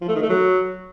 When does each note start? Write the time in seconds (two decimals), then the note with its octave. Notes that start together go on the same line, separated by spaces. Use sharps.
0.01 F3
0.08 A3
0.15 D#3
0.22 A3
0.29 F#3